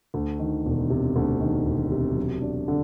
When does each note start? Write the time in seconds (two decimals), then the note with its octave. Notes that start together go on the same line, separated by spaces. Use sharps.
0.14 D2
0.39 D#3
0.66 E1
0.90 C3
1.16 D2
1.41 D#3
1.66 E1
1.92 C3
2.16 F#3
2.42 D4
2.68 D3